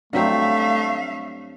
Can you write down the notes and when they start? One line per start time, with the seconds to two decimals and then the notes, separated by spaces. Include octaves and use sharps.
0.13 G2 F#3 A3 C4 E5 F5